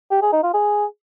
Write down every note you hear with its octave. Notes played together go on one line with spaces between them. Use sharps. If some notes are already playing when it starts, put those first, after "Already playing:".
G4
G#4
D#4
F4
G#4